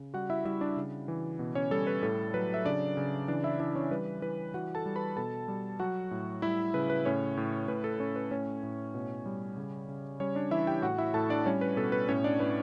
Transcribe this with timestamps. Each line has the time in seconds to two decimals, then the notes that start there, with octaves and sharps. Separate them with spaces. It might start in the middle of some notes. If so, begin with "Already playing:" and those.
Already playing: C#3
0.14 G3 F#4 F#5
0.30 E4 E5
0.45 G3 E4 E5
0.61 D4 D5
0.77 C#3
1.08 E3
1.39 B2
1.55 C#4 C#5
1.71 G3 A4
1.87 B4
2.03 A2 A4
2.34 F#3 B4
2.54 E5
2.65 C#3 D4 D5
2.97 C#3
3.28 E3 D4 D5
3.44 E4 E5
3.60 E3 D4 D5
3.76 C#4 C#5
3.91 G3 B4
4.22 E3 B4
4.54 E3 F#4 F#5
4.75 A4 A5
4.86 G3
4.96 B4 B5
5.17 B2 A4 A5
5.48 G3
5.80 F#3 F#4 F#5
6.11 A2
6.42 G3 E4 E5
6.74 C#3 B4
6.90 B4
7.05 A2 C#4 C#5
7.37 A2
7.68 A2 B4
7.84 A4
7.99 A2 C#4 C#5
8.16 B4
8.31 A2 C#4 C#5
8.63 A2
8.94 B2
9.26 G3
9.57 C#3
9.89 C#3
10.20 G3 C#4 C#5
10.35 D4 D5
10.51 E3 E4 E5
10.67 G4 G5
10.82 A2 F#4 F#5
10.98 E4 E5
11.14 A2 A4 A5
11.30 D4 D5
11.46 G3 C#4 C#5
11.61 B4
11.77 B2 A4
11.92 B4
12.09 A2 C#4 C#5
12.24 D4 D5
12.40 A2 B4